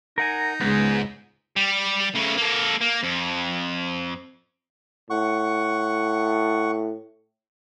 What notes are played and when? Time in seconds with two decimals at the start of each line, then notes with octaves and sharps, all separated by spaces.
0.18 D#4 A#4 F#5 G#5
0.61 C#2 G#2 B3 G#4
1.56 G3
2.15 C#3 A3
2.37 A#3 A4
2.81 A#3
3.03 F2
5.10 A2 F#5 C#6